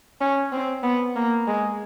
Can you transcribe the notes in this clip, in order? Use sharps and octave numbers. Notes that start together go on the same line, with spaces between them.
C#4
C4
B3
A#3
G#3